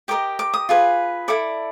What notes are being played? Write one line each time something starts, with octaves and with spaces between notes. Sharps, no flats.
G4 A#4 D#5 D6
D6
D#6
F4 G#4 B4
E4 A4 D5 D6